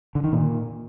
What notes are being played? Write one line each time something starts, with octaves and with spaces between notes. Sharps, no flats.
D3
D#3
A#2